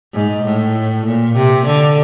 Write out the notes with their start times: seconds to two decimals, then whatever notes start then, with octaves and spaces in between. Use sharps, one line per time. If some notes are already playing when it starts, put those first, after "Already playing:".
0.14 G#2
0.45 A2
1.06 A#2
1.36 C3
1.66 D3